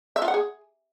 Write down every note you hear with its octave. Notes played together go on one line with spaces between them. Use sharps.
E5
F4
F#5
G#4